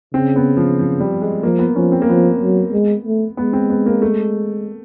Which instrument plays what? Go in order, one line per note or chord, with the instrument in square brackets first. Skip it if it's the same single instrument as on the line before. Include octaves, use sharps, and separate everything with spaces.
[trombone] C#3 [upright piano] C4
[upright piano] B3
F3
F3
G3
G#3
[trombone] F3 [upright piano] A#3
[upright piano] B3
[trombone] F3 [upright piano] C#4
[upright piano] C4
A#3
[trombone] F3 [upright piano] B3
[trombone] F#3
G#3
A3
[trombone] G#3 [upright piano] B3
[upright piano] C4
B3
A#3
A3